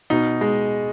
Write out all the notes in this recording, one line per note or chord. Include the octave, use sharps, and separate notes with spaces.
B2 D#4
G#3